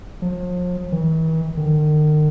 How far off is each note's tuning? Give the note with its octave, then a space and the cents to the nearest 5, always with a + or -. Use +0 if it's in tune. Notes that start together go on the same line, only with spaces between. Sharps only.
F3 +40
E3 -45
D#3 -40